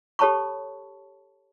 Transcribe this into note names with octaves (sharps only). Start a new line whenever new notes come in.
G4 A4 C#5 A5 B5 C#6